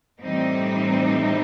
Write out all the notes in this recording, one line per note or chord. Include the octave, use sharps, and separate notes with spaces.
A2 E3 G3 C4 D#4